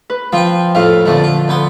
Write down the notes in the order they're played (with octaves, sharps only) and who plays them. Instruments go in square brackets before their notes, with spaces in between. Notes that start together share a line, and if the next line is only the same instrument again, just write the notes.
[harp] B4
[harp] F3 [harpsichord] C4 F4 G5
[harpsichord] F2 A2 A3 [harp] F4 F5
[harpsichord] F2 A#2 A3 [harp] D3 F3 C4
[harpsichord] F4
D2 B3 C6